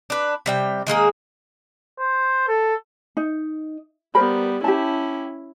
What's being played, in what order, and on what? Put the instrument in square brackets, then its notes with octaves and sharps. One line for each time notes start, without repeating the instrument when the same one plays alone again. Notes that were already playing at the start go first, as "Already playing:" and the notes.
[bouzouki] D4 B4
C3 G3 G5
D#3 G#3 A#3 G#4
[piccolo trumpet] C5
A4
[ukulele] D#4
[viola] G3 B3 [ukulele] A#4 C5 B5
[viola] C#4 E4 [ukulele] G4 A5